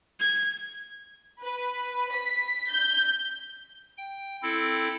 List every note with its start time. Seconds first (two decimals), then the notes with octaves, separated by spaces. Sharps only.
0.20 G#6
1.42 B4
2.12 B6
2.70 G6
3.98 G5
4.42 C4 E4 A4